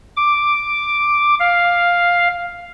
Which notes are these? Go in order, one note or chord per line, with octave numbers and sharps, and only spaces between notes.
D6
F5